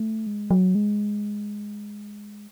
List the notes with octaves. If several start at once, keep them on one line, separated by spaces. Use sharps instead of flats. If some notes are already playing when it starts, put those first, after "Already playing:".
Already playing: A3
G#3
F#3
G#3